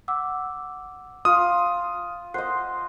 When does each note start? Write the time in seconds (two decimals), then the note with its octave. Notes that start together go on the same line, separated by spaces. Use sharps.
0.08 F#5 D6 E6
1.25 F4 D#6
2.34 C5 D#5 F#5 F#6 C7